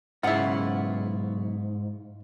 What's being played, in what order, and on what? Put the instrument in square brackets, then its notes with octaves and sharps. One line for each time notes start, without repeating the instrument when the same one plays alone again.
[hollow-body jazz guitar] B1 C#3 F#5 [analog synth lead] G#2 [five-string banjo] E4 F4